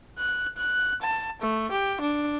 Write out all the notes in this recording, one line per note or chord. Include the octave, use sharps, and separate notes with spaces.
F#6
F#6
A5
A3
G4
D4